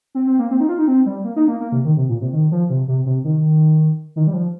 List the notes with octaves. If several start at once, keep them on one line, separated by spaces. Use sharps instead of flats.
C4
C4
A#3
C4
D#4
F4
D#4
C4
G3
A#3
D#4
A#3
A#3
C3
D#3
C3
A#2
C3
D#3
F3
C3
C3
C3
D#3
D#3
G3
F3